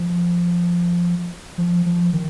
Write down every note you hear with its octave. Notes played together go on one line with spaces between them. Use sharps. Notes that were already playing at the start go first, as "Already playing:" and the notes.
Already playing: F3
F3
F3
D#3